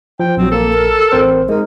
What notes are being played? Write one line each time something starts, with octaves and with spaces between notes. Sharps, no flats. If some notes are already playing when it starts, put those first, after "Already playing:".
F3 G5
A#1 F#3 C4
A#3 A4
A#4
A1 C4 C5
G#3 D#4 A#4